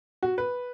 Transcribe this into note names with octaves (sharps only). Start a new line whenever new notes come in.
F#4
B4